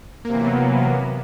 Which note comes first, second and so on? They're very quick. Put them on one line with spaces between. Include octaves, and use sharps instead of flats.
A#3 C3 E3 F#3 B3